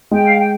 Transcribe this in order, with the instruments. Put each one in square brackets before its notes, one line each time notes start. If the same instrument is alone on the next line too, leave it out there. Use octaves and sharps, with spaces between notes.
[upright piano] G#3 [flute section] G5
[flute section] F5
G5